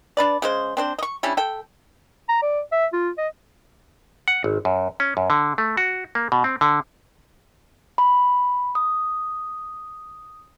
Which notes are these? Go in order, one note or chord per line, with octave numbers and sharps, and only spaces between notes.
D4 B4 D5
C#3 G#3 C5
C4 D4 C5
D#5 C#6
G3 C#4 D4 E4
A4 G5
A#5
D5
E5
F4
D#5
F#5
G#1
F#2
C#4
F#2
D3
A3
F#4
A#3
B2
C4
D3
B5
D#6